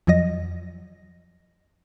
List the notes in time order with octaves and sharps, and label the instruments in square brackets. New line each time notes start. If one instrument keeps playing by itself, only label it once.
[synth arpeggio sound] F2 F3 F#3 D#5 A#6